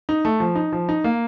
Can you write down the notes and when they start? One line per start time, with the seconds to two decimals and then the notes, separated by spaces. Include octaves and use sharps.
0.09 D#4
0.25 A3
0.40 F3
0.55 D#4
0.72 F3
0.89 D#4
1.04 A#3